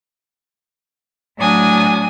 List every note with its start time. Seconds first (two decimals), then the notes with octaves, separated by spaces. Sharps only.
1.39 A2 F#3 D4 G#5 D#6